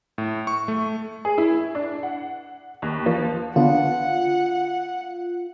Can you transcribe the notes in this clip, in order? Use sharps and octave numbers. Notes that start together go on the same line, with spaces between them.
A2
C#6
A3
G#4
E4
D4
F#5
D#2
F3
D3 B3 D4 F4 F#5